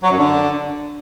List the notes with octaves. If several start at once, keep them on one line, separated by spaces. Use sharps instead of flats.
F#3
F#2
D3